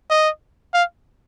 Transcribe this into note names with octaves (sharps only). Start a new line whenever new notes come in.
D#5
F5